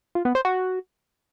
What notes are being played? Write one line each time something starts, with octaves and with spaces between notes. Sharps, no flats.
F4
B3
C5
F#4